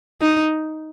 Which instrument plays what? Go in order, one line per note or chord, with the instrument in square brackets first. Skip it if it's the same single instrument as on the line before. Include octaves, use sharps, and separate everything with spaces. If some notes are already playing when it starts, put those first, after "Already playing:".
[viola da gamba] D#4